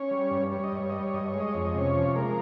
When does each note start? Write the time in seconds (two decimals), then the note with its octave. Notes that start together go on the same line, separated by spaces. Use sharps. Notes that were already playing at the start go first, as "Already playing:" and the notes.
Already playing: C#4 C#5
0.11 G3
0.31 G2
0.52 G3 C#5
0.64 D#5
0.72 G2 C#5
0.90 G3 D#5
1.02 C#5
1.13 G2 D#5
1.28 C#5
1.34 G#3
1.40 D#5
1.53 F2 C#5
1.65 D#5
1.74 C3 C#4 C#5
1.95 F3
2.15 G#3 A#3 A#4